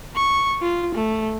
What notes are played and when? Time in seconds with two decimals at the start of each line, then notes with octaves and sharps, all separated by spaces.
0.16 C#6
0.62 F4
0.95 A3